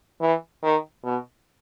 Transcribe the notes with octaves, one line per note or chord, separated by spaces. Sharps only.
E3
D#3
B2